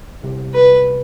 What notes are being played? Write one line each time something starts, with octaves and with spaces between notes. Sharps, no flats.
C2 C3
B4